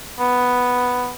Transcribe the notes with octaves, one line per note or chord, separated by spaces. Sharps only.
B3